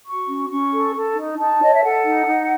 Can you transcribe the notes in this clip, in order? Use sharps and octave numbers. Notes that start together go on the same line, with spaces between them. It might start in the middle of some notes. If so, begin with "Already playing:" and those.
F#4 C#6
C#4
C#4 C#6
A4
A4
D#4
D#4 A5
C#5 D#5
E5
A4 F#5
D#4
D#4